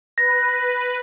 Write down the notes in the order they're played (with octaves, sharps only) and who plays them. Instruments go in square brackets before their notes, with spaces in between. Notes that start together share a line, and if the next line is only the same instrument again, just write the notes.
[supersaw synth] B4 [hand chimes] A#6